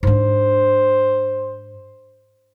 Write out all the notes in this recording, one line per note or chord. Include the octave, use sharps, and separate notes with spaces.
G#2 D4 C5